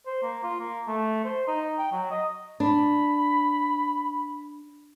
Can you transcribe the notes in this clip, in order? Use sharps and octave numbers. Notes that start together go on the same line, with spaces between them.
C5
A#3
F4
A#3
A3
C5
D#4
G5
F#3
D#5
D4 B5